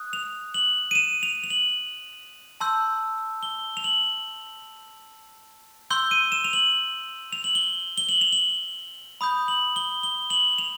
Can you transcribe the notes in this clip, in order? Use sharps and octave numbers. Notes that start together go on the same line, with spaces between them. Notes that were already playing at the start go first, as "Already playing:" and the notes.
Already playing: D#6 F#6
F7
F#7
D#7
E7
F7
F7
F#7
A5 C6 E6 G6
G7
F7
F#7
C6 E6 G6 G7
D#7
E7
F7
F#7
F7
F#7
G7
G7
F#7
F7
F#7
B5 D#6 G6
F#7
G7
G7
F#7
F7